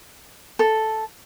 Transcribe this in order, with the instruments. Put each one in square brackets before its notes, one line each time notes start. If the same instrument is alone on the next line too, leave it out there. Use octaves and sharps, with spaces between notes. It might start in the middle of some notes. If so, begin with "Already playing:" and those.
[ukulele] A4